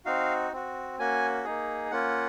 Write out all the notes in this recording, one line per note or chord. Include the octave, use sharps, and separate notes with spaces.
C4 D#4 F#4 F5
C4 F#4
A#3 C#4 F#4 G#5
A#3 D#4 G#4
A#3 C#4 F4 F#5